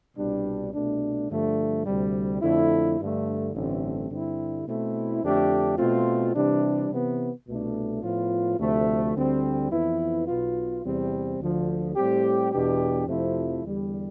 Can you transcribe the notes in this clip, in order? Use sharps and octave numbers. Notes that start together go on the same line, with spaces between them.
C2 B2 G3 D4
C2 B2 A3 D4
G2 D3 F3 A3
D2 C3 G3
F2 D3 A3 E4
G2 D3 A3
A1 G2 D3 A3 C4
G2 D3 G3 C4 E4
B2 A3 C4 E4
F2 D3 A3 D4 G4
B2 A3 C4 F4
C3 E3 G3 D4
C3 E3 B3
C2 B2 A3 D4
A2 F3 B3 F4
D2 C3 F3 A3
D2 D3 G3 C4
F2 E3 B3 E4
B1 B2 B3 F4
E2 C3 G3 C4
D2 D3 F3
A2 G3 C4 G4
E2 B2 B3 D4 G4
F2 C3 F3 A3 E4
E2 D3 G3